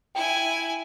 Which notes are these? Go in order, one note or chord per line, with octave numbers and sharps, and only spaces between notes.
E4 G5 G#5